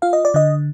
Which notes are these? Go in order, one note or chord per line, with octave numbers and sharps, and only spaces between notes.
F4 F5
D#5
D5
D3 D#5